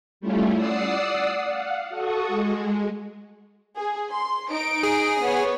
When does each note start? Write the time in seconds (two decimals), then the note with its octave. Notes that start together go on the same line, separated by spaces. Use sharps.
0.21 G3 A3 C#4 E4 F4
0.55 D5 F#5 D#6 E6 C7
1.44 F5 F#5
1.89 F#4 A4 C#6 D#6
2.28 G#3
3.76 G#4
4.11 C6
4.51 D#4 D7
4.83 G#4
5.22 B3 C#5